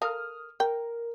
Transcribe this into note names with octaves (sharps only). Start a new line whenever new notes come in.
A4 A#4 F5 D#6 F6
A#4 G5